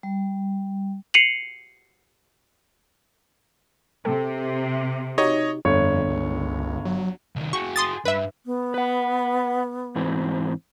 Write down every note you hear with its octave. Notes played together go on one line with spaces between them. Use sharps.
G3
C7 C#7 D#7 F7 F#7
C3 A4 G5
D#4 F#4 G4 C#5 D#5
G1 F2 C#5
C#2
F#3
C2 D#3
F#4 G#4 C#6
C6 D#6 A6
G2 B4 E5
B3
B4 F#5
G#2 E3 C4